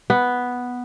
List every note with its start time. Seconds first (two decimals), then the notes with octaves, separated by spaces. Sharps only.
0.10 B3